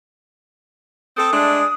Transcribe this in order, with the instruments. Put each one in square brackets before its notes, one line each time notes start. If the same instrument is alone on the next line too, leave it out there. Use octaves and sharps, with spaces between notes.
[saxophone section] C4 A4 [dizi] D#6
[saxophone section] G#3 A3 D4